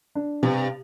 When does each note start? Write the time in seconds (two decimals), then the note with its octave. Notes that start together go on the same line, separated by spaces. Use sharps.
0.15 D4
0.43 G2 C3